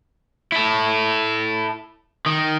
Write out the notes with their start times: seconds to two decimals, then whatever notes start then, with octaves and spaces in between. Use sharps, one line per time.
0.52 E4 A4
2.26 D#3